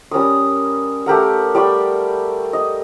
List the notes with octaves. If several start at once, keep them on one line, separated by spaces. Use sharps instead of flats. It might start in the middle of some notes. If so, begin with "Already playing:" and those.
G3 C#4 A#4 D#6
A3 G4 A#4 F#5
G3 D5 G5 C#6
D#5